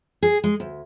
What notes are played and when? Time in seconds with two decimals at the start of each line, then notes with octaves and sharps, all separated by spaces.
0.22 G#4
0.44 G#3
0.60 D2